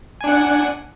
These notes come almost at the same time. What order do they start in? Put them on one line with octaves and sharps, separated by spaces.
G#5 D4 F#5